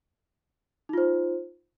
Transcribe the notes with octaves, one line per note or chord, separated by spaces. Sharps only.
D#4 F4 C5